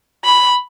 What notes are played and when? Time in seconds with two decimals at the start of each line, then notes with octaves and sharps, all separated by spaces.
0.25 B5